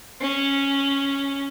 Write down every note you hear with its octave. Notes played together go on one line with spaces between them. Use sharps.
C#4